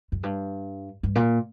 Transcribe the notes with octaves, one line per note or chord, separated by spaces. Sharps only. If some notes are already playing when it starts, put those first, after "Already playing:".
F#2
G2
G2
A#2